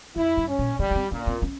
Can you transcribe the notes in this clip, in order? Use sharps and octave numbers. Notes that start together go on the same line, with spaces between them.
F2 E4
G2
C#4
A#2
C#3 G3
A#3
C4
A#2 C#4
C4
C#4